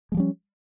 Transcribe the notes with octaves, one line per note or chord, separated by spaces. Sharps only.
F3 G3 G#3 C#4